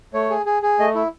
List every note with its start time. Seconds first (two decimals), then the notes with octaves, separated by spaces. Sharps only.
0.14 A3 C#5
0.30 G#4
0.46 G#4
0.62 G#4
0.79 A3 D#5
0.95 E4